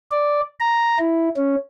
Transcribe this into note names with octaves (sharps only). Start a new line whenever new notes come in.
D5
A#5
E4
C#4